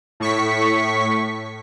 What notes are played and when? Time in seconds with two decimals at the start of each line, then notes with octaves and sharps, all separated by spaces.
0.20 A2 C#6 B6